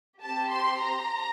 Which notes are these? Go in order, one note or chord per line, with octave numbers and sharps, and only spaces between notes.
C4 G4 A5
C6
A#5